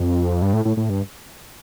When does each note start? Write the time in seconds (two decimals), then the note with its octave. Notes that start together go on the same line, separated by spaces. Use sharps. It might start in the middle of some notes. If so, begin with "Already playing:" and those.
Already playing: F2
0.42 G2
0.53 A2
0.65 A2
0.77 A2
0.89 G2